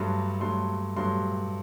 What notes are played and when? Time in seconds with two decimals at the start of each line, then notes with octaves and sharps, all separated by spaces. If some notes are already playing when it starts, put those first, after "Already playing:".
Already playing: G2 F#3 A3 C6
0.40 G2 F#3 A3 C6
0.96 G2 F#3 A3 C6